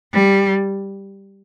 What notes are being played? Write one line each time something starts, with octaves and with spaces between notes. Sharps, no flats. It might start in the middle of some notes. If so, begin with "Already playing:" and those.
G3